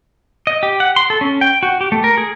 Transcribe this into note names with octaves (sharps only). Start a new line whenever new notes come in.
D#5
G4
F#5
C6
A4
C#4
G5
F#4
G4
A3
A#4
G#4